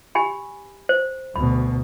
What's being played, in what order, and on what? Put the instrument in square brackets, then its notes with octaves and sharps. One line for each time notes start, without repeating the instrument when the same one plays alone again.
[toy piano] G4 G#5 B5
C5
[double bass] D2 B2 [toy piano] B5